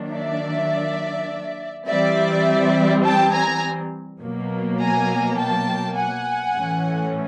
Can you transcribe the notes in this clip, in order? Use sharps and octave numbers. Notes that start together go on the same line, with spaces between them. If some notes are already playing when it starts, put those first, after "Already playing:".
Already playing: D#3 F#3 A#3 D4
D5 E5
E3 G3 C4 D5 E5
G5 A5
G#5 A#5
B2 F#3 A#3
G#5 A#5
G5 A5
F#5 G#5
A2 E3 A3 C#4